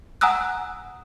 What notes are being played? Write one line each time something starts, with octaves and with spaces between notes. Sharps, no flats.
F#5 G#5 A#5 D#6 E6 F#6